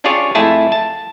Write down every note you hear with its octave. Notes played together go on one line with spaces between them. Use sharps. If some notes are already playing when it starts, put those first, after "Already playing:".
C#4 D4 F4 G4 G#4 C#5
F2 A3 E4 F4 G#4 A5
A5